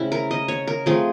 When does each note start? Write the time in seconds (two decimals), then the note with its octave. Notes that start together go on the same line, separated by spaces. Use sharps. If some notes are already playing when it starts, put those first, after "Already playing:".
Already playing: C#3 A3 C4 E4
0.12 A#4
0.31 D#5
0.48 C#5
0.67 A#4
0.86 F3 A3 C4 G#4